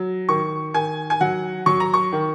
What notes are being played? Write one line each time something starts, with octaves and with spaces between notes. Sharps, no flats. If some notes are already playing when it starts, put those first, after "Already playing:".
Already playing: F#3
D#3 C#6
D#3 G#5
G#5
F#3 F#5
F#3 C#6
A#5
C#6
D#3